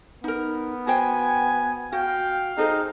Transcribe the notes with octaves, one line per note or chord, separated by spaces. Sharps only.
B3 D#4 A#4
F#4 C5 G5 G#5
F#4 F5 G5
D#4 G#4 A4 C5